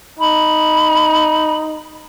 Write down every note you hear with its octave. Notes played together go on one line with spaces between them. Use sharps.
D#4 B5